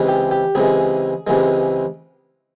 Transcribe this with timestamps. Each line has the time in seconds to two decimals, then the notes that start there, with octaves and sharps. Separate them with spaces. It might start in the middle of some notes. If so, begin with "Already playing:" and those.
Already playing: C#2 C3 E3 G#3
0.08 G4
0.31 G4
0.55 C#2 C3 E3 G#3 G#4
1.27 C#2 C3 E3 G#3